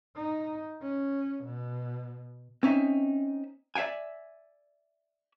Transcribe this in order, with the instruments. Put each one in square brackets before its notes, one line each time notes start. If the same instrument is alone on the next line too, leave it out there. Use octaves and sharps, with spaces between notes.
[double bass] D#4
C#4
B2
[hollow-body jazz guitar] C4 C#4 D#4 E5
D5 E5 F5 G5 G#5